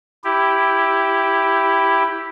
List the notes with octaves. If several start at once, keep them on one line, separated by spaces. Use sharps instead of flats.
E4 G4